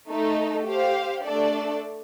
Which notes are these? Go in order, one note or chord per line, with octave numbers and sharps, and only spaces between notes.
A3 D#4 A4
G4 C5 F5
A3 D4 A4 D5